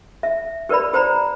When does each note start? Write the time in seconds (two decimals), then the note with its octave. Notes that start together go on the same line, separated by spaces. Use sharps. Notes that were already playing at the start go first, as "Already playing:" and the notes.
0.23 E5
0.69 G4 A#4 B4 D5 B5
0.94 G4 C5 D5 A#5 B5